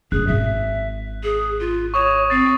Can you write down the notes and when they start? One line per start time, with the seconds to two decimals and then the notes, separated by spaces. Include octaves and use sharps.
0.12 F#1 F#2 G#4 F#6
0.27 G#1 E5 B6
1.23 G#4
1.60 F4
1.94 C#5 C#6 D#6 E7
2.30 C4 A6 C7